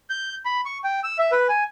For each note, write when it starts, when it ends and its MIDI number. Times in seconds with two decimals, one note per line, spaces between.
0.10 0.35 91
0.45 0.61 83
0.65 0.78 85
0.84 1.00 79
1.04 1.17 88
1.19 1.31 76
1.32 1.47 71
1.49 1.64 80